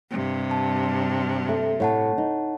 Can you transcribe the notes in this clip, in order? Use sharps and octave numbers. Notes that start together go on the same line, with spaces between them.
G2 C3
A5
A3
A2 C#5 F#5 A5
D#4